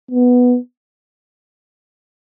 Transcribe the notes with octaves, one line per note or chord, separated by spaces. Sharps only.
B3